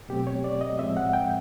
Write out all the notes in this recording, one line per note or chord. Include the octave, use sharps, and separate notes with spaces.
B2 F#3 A3 C4 G4
C#5
D5
D#5
A2 F3 G#3 C4 E5
F#5
G5